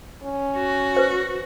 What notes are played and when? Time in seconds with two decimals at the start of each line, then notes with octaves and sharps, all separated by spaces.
0.23 C#4
0.56 F#4
0.97 B4 C5